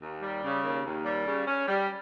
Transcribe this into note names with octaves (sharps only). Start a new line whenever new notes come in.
D#2
G3
C#3
D#2
D#2
G3
C#3
C#4
G3